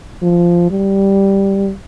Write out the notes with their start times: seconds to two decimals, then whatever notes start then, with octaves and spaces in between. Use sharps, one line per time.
0.22 F3
0.71 G3